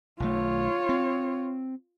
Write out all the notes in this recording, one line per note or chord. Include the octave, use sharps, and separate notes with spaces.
B1 D#3 A3 F4 C#5
C4